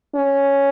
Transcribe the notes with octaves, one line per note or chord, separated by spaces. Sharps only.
C#4